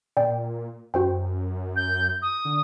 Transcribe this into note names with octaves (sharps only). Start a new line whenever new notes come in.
A#2 D5 G5
F#2 F#4 C5 G5
G6
D#6
D3